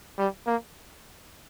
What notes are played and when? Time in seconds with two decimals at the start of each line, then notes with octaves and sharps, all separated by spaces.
0.19 G3
0.47 A#3